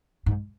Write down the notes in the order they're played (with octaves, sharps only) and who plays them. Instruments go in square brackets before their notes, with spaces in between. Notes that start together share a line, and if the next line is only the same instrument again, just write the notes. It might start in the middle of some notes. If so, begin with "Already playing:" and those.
[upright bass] G#2